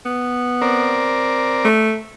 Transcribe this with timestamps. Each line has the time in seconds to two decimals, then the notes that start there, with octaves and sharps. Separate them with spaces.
0.06 B3
0.62 C4 A#4 D5
1.65 A3